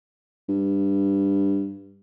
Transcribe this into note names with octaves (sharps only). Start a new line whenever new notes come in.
G2